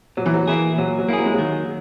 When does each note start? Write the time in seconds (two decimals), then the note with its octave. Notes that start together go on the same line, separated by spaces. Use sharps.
0.17 A#2 F#3
0.26 E3
0.34 F#3
0.48 E3 A#3 E4 G#4
0.78 A#2 F#3
0.99 F#3
1.09 A#3 E4 G#4
1.19 F#3
1.26 G#3
1.34 F#3
1.39 D#3